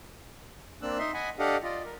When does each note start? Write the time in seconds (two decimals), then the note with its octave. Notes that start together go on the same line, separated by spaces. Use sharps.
0.82 A#3 C4 D4 E6 F#6
0.99 D#4 D#5 E5 C6
1.14 D#5 F#5 G#5 B5
1.39 D4 G4 A4 D#5 F5 F#5
1.63 F4 D5 D#5
1.86 A#4